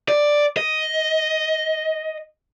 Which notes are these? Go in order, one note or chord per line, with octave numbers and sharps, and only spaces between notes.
D5
D#5